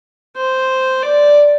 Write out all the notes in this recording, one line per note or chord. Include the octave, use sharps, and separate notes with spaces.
C5
D5